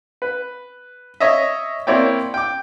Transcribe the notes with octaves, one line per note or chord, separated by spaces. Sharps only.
B4
C#5 D#5 E5
A#3 C4 E4 C#5 D5 G5
G5 D6